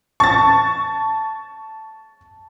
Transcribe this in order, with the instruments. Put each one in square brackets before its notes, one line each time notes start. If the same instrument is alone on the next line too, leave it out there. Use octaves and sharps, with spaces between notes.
[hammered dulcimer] A5 [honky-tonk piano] C#6 A6